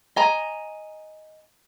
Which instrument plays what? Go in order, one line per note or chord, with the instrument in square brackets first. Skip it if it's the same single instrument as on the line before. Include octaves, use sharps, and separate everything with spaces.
[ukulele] D#5 G#5 A#5